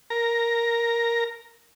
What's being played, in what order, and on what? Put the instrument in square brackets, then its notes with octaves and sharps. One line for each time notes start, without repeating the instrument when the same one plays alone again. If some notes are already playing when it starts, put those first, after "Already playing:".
[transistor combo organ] A#4 A#5